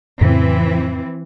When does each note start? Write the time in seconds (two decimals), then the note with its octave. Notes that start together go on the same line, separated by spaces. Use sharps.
0.21 F2 A2 C#3 E3 C4